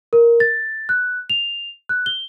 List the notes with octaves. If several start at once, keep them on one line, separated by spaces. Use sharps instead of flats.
A#4
A6
F#6
F7
F#6
G7